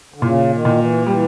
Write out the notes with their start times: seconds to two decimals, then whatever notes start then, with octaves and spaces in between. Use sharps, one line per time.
0.14 D3
0.22 A#2 C#3
0.50 D#3
0.65 A#2
0.79 E3
1.06 E3 G3